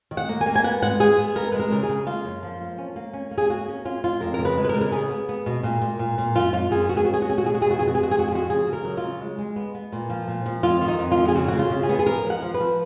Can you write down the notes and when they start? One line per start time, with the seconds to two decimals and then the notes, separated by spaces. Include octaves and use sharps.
0.11 D#3
0.17 F#5
0.29 A#3
0.41 G#5
0.46 A#3
0.55 G#5
0.64 B3 F#5
0.82 G#2 F#5
1.00 G#2 G#4
1.18 B3
1.35 B3 A#4
1.52 G#3 B4
1.59 A#4
1.72 C#3 A#4
1.83 G#4
1.89 C#3
2.07 A#3 F4
2.25 F#2
2.43 F3
2.60 A#3
2.78 C#4
2.96 A#3
3.13 C#4
3.31 A#3
3.38 G#4
3.50 A#3 F#4
3.68 C#4
3.85 C#4 F4
4.03 C#4 F4
4.21 F2 A#4
4.34 C#3 A#4
4.45 B4
4.57 G#3
4.64 B4
4.69 A#4
4.75 C#3
4.81 A#4
4.92 B3 G#4
5.10 B3
5.29 B3
5.46 B2
5.63 A#2
5.81 A#2
5.99 A#2
6.18 A#2
6.35 F#2 F4
6.53 F#2 F4
6.71 F#2 G#4
6.89 B3 F#4
6.97 G#4
7.05 C#4 F#4
7.13 G#4
7.22 F#4
7.25 C#4 G#4
7.38 F#4
7.42 B2 G#4
7.55 F#4
7.60 B2 G#4
7.71 F#4
7.78 F2 G#4
7.87 F#4
7.95 F2 G#4
8.03 F#4
8.11 G#4
8.14 F2 F#4
8.28 G#4
8.32 F3 F#4
8.49 C#3 G#4
8.67 C#3
8.73 A#4
8.85 F#3
8.97 F4
9.03 C#3
9.21 G#3
9.39 G#3
9.56 B3
9.75 B3
9.92 A#2
10.10 F3
10.28 A#2
10.46 F3
10.63 F2 F4
10.81 D#3
10.88 D#4
10.99 F2
11.12 F4
11.17 F2
11.28 G#4
11.35 C#3 F#4
11.48 C#3 F#4
11.59 F4
11.70 C#3
11.83 G#4
11.89 B3
11.99 G#4
12.06 F3 A#4
12.25 F3
12.30 F#5
12.42 F3
12.54 B4
12.60 F3